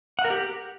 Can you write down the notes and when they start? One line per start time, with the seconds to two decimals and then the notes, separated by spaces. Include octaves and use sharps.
0.19 F#5
0.25 A#4
0.30 G4